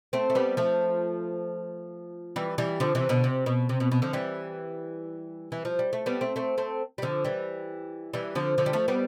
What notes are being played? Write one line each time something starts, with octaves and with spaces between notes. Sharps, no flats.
A3 C4
A3
G3 B3
F3 A3
E3 G3
E3 G3
D3 F3
C3 E3
B2 D3
C3
B2
C3
B2
B2
D3 F3
E3 G3
E3
F3
G3
A3
G3 B3
A3 C4
A3 C4
A3 C4
G3
D3 F3
E3 G3
E3 G3
D3 F3
D3 F3
G3
F3 A3
G3 B3